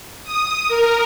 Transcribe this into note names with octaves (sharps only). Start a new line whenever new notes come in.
D#6
A#4